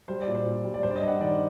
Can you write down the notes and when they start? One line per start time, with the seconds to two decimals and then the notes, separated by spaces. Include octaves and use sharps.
0.08 G3 C5
0.22 D5
0.27 A#2
0.35 C5
0.46 A#2
0.64 G3
0.74 D5
0.83 G2 C5
0.91 D5
0.96 D#5
1.02 G2
1.08 F#5
1.21 D#3 D5